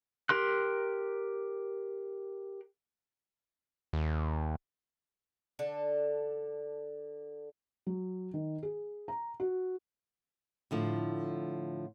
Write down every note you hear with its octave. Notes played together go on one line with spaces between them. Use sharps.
G4 A#4 C6 F#6
D#2
D3 D4 A4 A5
F#3
D#3
G#4
A#5
F#4
A2 D3 F3